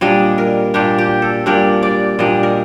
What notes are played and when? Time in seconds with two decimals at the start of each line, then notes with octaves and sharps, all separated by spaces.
0.01 A#2 G3 D4 D#5
0.38 A#4
0.74 A#2 G3 D4 G4
0.98 G4
1.22 A4
1.46 A#2 G3 D4 A#4
1.83 D5
2.19 A#2 G3 D4 D#5
2.43 A#4